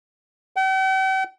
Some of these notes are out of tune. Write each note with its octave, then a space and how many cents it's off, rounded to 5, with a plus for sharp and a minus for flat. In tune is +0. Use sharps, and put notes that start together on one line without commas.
G5 -45